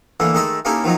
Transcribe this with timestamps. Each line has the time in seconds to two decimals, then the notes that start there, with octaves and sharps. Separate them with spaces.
0.20 D3 E3 A3 A#3
0.34 D#3 G#3 A3 D#5 E5 A5
0.65 A#3 C#4 D#4 E4 G4 A4
0.84 D#3 F3 F#3 D#4